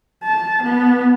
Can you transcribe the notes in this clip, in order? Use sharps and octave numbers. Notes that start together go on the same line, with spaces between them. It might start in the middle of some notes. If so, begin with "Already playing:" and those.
A5
B3